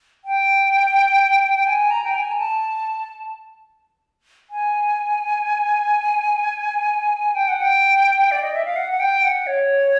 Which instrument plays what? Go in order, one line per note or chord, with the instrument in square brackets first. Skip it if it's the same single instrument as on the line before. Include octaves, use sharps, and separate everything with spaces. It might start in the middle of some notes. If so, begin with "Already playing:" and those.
[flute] G5
G5
G#5
A#5
G5
G#5
A#5
A5
G#5
G5
F#5
G5
D5
D#5
E5
F5
F#5
F#5
G5
F#5
C#5